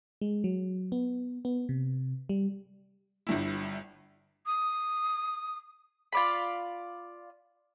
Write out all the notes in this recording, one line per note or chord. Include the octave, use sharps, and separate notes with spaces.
G#3
F#3
B3
B3
C3
G3
G1 G2 E4
D#6
F4 D5 B5